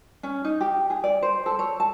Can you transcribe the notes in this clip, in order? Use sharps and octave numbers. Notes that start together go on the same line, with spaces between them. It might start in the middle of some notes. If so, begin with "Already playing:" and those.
C#4
D#4
G4
G#4
D5
C5
A4
C#5
A5